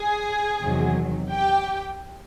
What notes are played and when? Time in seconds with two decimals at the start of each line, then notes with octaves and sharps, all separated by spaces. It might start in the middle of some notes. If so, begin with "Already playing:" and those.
Already playing: G#4 G#5
0.62 E2 C3 D#3 F#3
1.31 G4 G5